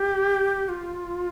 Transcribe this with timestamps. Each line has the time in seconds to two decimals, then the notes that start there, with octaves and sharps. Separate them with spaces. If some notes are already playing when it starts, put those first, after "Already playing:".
Already playing: G4
0.69 F4